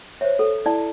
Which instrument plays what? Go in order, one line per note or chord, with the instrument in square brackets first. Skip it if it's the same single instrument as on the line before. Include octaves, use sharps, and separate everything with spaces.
[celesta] C5 C#5 [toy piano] E5
[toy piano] A4
[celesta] E4 [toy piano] D5 A5